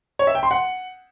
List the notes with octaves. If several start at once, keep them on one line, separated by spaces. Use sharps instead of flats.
C#5
E5
G5
C6
F#5